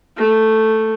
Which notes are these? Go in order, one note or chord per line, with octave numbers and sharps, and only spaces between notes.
A3